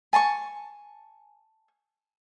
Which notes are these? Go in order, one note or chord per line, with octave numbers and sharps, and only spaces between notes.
G#5 A5 C6 C#6